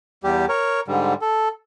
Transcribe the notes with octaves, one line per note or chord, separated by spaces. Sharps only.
E2 G3 G4
A#4 C#5
G#2 D3 G3
A4